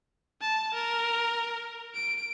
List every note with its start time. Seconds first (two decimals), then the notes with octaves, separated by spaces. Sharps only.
0.41 A5
0.74 A#4
1.95 D7